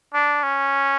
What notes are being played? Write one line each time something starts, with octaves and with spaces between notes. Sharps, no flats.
D4
C#4